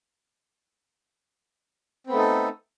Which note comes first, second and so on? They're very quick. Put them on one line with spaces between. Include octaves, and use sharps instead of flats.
C4 B3 A3 D#4 A4